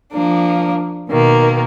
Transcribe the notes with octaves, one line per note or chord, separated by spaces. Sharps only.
F3 A#3 D4
B2 D#3 A#3